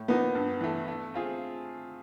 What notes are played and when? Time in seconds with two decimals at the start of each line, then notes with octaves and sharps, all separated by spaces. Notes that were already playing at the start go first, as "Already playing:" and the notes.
Already playing: A2
0.08 F3 A#3 B3 D#4
0.35 G2
0.61 E3 A3
0.88 A3
1.14 C4 F4 G#4